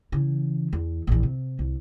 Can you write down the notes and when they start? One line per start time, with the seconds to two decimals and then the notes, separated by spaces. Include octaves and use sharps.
0.12 C#3 E3
0.73 E2
1.07 A#1 E3
1.23 C3
1.59 C2